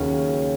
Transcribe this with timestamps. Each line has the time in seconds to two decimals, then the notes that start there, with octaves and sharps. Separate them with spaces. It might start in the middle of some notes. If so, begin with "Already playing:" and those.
Already playing: D#2 C#3 F#3 C#4